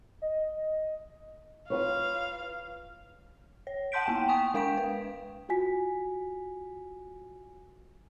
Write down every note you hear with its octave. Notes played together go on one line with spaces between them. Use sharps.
D#5
F4 B4 C#5 F5
C#5
F#5 A5 C6 G6 B6 D7
A#3 B3 F#5 G5
G5 G#5 C#6 D#6 B6
G#3 A#4 F5 G5 B6
B4
F4 F#4 G#5 B6